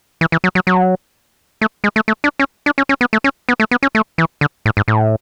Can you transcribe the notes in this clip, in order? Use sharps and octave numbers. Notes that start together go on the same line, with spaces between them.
E3
E3
F#3
F#3
F#3
A3
G#3
A3
A3
D4
C#4
D4
C#4
C#4
B3
A3
C#4
B3
A3
B3
C#4
A3
E3
D3
A2
G#2
A2